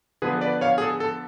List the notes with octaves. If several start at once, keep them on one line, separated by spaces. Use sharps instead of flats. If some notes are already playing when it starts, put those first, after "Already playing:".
D3 F3 B3 G#4 B4
B4 D5
C#5 F5
G#4
A4
A4